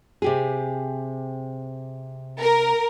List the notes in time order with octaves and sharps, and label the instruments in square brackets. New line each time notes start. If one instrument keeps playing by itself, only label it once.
[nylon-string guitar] C3 G4 G#4
[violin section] A#4